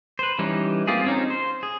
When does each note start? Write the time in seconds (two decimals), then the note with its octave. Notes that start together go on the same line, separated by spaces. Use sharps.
0.19 B4 C5
0.39 E3 G3 C#4 D#4
0.87 A#3 C4 F4 G4 G#4
1.05 C4 C#4 D#4
1.30 C5
1.63 G#4